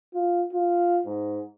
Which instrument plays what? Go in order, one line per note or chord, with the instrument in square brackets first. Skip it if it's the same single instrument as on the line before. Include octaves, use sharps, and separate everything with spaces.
[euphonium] F4
F4
G#2